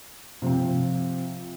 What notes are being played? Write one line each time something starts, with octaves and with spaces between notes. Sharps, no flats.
C3 F3 C4